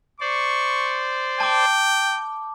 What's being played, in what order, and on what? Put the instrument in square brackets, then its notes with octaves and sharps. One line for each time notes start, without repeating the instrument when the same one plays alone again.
[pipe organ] C5 D5 [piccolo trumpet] C#6
[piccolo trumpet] G5 [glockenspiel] A5 D6